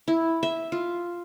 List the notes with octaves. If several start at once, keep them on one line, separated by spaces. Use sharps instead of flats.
E4
E5
F4